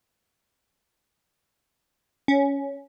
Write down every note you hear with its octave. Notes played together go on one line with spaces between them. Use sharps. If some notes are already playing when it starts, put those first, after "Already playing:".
C#4